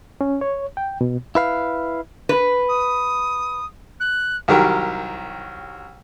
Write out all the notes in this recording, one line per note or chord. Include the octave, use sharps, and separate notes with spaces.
C#4
C#5
G5
B2
E4 B4 F5
B4
D#6
F#6
C2 D#3 F#3 G4 A#4